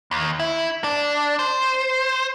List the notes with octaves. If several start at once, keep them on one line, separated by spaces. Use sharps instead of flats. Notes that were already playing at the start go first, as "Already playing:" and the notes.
D#2
E4
D4
C5